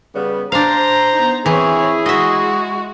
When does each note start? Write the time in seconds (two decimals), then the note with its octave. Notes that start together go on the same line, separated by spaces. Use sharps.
0.14 C#3 G3 B3
0.52 D4 C5 F5 A#5
1.13 B3 D#4
1.46 E3 C4 E4 G#4 C#5
2.06 G#3 F#4 D#5 E5